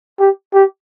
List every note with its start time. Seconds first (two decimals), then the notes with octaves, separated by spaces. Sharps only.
0.20 G4
0.54 G4